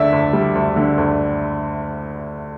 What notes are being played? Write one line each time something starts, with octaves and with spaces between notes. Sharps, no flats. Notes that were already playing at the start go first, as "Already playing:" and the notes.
Already playing: D2 D3 D5 E5
D2
G3
D2
D3
D2